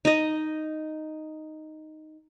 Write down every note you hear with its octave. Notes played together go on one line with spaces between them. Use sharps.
D#4 D#5